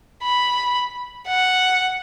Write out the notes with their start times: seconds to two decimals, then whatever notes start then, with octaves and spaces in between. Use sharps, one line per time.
0.23 B5
1.28 F#5